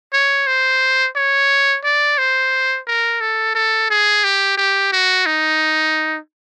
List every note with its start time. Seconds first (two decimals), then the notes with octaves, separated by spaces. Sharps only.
0.13 C#5
0.47 C5
1.16 C#5
1.84 D5
2.18 C5
2.87 A#4
3.21 A4
3.55 A4
3.90 G#4
4.24 G4
4.58 G4
4.92 F#4
5.26 D#4